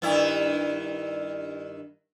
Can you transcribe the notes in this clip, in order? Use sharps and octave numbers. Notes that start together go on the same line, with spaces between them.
G2 D#3 E4